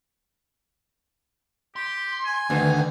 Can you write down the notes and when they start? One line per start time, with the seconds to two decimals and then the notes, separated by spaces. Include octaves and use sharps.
1.76 G4 C6
2.26 G#5
2.50 D2 D3 D#3 B4